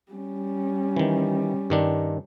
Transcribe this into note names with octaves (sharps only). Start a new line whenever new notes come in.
G3 C#4
D#3 E3
G2 D#3 D4